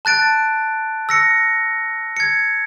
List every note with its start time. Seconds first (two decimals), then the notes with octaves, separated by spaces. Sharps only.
0.05 A5 F#6 A6 D7
1.09 E6 A#6 C#7
2.17 G#6 C#7